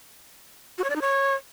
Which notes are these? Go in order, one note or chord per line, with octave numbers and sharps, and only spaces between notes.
F#4
C#5
D5
D#4
C#5